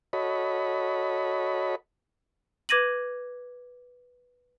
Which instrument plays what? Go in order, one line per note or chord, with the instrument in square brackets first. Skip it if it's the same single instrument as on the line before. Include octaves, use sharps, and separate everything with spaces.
[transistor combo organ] F#4 A4 C#5 D#5 B5
[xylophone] B4 D6 G#6 A#6 D#7 F#7